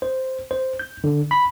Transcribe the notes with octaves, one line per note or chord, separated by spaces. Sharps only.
C5
C5
G6
D3
B5